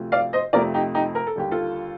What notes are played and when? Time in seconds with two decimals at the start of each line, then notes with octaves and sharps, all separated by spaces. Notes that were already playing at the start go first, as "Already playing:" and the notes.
Already playing: D2 C3 F3 A3
0.12 D5 F5
0.33 C5 D#5
0.53 F2 C3 F3 A3 A#4 D5
0.74 D#4 G4
0.95 D#4 G4
1.15 A#4
1.27 A4
1.36 D#2 D3 G3 G4
1.51 F4 A4